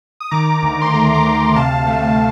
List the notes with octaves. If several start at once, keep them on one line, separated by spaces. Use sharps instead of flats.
D#6
D#3 A#5 D6
D2
C6
A3 A#5 D6
A#5 D6
D2
C3 F5 A5
A3